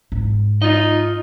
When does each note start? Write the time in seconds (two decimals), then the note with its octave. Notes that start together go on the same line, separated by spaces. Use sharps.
0.12 G#2 G#3
0.62 D#4 F4 D#5